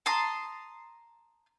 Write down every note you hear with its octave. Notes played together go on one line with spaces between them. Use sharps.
A5 A#5 C6 D#6